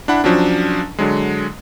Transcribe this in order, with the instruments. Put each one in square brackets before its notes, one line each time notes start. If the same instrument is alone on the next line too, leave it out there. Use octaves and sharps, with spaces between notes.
[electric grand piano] D4 E4 F#5 B5
F3 F#3 C#4 D4
D3 F#3 G#3